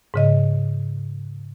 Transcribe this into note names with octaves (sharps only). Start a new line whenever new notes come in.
G#2 C#3 D#5